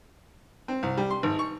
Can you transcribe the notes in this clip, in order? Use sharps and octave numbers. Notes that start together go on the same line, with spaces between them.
C4
C2
G3
C6
G#1
C#6